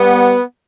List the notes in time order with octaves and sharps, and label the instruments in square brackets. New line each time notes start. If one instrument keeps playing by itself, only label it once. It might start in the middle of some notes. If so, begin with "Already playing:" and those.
Already playing: [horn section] G3 B3